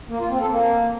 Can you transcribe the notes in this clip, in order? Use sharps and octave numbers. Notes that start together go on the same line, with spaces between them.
A#3
F4
C4
A4
A#3